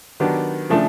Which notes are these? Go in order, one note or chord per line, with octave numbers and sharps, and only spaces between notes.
D#3 F#3 B3 D4 G4
C#3 F3 A3 D4